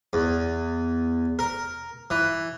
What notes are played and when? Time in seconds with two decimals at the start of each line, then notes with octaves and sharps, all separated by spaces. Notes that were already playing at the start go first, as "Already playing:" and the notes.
0.13 E2
1.39 A#4
2.10 E3